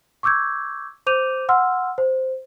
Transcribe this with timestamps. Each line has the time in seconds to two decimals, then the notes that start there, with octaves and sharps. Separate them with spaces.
0.23 C#6 D6 E6 G6 G#6
1.06 C5 D6 G6 D#7 F7
1.49 F#5 C6 E6 F6
1.98 C5